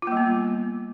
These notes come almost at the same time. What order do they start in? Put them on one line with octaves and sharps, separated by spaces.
F4 A#3 G3 B3